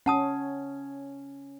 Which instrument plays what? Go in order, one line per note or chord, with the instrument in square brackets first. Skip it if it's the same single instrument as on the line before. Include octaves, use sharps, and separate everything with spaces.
[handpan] C#4 [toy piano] F#5 A5 D#6